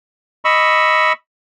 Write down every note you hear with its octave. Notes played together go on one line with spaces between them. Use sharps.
D#5 B5 C#6 E6